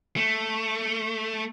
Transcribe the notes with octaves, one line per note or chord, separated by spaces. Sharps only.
A3